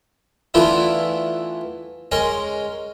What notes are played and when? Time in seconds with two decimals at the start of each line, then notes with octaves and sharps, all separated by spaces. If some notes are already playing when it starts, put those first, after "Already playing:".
0.54 E3 A3 B3 D4 E4 F4
2.12 G#3 C#4 A#4 C6